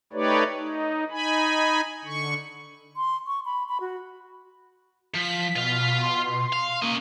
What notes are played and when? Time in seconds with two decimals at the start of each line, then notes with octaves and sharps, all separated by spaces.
0.13 A3 D#4 G4 B4 C#5 D5
0.57 D#4
1.11 D#4 G#5 B5
2.05 D3 C#6
2.97 C6
3.27 C#6
3.45 B5
3.68 B5
3.81 F#4
5.15 F3 B6
5.56 B2 F4 F5
6.02 C6
6.53 F5
6.82 A#3 C#4 D#5